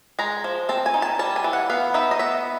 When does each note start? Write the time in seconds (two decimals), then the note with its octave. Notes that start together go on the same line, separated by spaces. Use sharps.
0.19 G#3 A#5
0.44 F3
0.69 C4 A5
0.86 G#5
0.94 D#4
1.02 A5
1.19 G3 A5
1.36 G#5
1.44 E3
1.53 F#5
1.70 B3 F5
1.94 D#4 E5
2.11 D#5
2.19 B3 E5